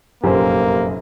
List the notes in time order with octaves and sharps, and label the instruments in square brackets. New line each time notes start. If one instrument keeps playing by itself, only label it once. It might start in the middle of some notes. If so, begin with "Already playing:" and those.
[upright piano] F1 A#1 F#2 [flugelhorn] A#3 [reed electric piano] G4 C5